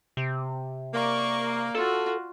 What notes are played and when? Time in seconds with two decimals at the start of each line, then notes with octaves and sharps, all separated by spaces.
0.17 C3
0.94 A#3 D5 C#6
1.75 F4 F#4 A4